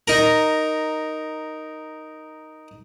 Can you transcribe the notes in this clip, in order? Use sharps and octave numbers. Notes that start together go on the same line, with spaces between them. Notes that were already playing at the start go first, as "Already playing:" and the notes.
D#4 A#4